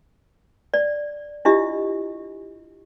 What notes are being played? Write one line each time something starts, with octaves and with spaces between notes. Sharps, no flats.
D5
D4 E4 F4 G4 D#5 E5